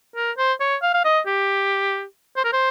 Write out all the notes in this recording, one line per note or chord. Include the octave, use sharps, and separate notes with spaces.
A#4
C5
C#5
F5
F5
D#5
G4
C5
A#4
C5